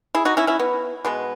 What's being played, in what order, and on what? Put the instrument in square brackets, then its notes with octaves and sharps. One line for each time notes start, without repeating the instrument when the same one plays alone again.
[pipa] E4 G#4
D#4 F#4
C#4 E4
C#4 E4
B3
B2 G#3 B3